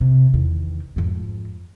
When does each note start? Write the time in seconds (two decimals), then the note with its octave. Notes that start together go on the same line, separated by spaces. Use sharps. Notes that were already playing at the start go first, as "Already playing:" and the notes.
0.01 C3
0.34 E2 D#3
0.96 F2 G#2